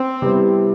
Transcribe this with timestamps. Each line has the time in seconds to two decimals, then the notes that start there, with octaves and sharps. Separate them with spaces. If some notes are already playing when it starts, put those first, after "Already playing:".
Already playing: C4
0.22 C3 G3 B3 E4